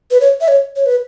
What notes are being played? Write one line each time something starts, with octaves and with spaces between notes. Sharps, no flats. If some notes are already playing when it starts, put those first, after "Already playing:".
B4
C#5
E5
C#5
C#5
B4